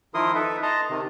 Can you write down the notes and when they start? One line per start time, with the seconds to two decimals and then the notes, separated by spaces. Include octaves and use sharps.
0.14 D#3 F3 E4 A#4 C6 D#6
0.35 D#4 A4 B4 E5
0.63 D#5 A5 A#5 C6
0.90 C3 D#3